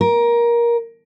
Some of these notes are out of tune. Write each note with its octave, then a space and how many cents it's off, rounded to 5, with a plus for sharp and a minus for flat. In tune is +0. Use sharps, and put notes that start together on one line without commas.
A#4 +15